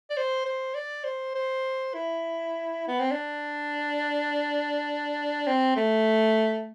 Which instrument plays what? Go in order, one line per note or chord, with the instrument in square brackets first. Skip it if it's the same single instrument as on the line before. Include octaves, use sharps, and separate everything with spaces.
[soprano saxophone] D5
C5
C5
D5
C5
C5
E4
B3
C4
D4
C4
A3